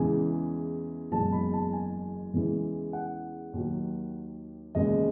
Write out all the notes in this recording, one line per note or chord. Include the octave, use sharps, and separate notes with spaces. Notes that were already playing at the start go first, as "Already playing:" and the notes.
Already playing: E2 C#3 E3 G#3 G#5
F#1 E2 B2 G#3 A5
B5
A5
G#5
E2 C#3 E3 G#3
F#5
D#2 D#3 F#3
E1 D#2 C#3 G#3 D#5